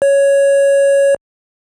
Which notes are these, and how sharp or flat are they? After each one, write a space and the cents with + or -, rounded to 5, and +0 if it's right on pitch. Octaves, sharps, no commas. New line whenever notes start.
C#5 +5